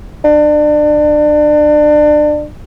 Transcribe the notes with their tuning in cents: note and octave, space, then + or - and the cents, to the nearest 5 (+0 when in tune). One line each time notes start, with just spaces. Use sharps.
D4 +30